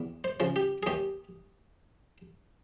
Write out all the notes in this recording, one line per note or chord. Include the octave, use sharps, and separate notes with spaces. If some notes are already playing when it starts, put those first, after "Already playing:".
Already playing: E2
C5
C#3 F3
G4
G#4
D#2 G4